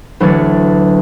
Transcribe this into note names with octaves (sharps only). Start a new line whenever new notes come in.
D2 E3 F#3 C#5 A6